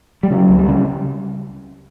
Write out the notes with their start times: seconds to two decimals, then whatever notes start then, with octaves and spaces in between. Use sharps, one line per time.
0.23 G3
0.30 C#3 F#3
0.49 C#2
0.58 G3
0.68 C#3